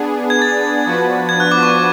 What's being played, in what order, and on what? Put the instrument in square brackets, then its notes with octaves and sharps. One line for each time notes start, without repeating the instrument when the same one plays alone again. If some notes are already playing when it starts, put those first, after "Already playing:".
Already playing: [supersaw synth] B3 D4 G#4
[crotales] G#6
A6
[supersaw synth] F3 B3 D4 F#4 B4
[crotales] G#6
F#6
D6
C#6